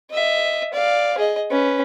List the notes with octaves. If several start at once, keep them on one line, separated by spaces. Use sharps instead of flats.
D#5 E5
D5 F5
G#4 D#5
C#4 B4